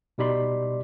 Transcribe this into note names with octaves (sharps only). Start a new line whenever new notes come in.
B2 G3 D#4 D5 B5 C6